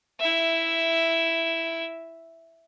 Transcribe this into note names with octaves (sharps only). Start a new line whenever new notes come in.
E4 E5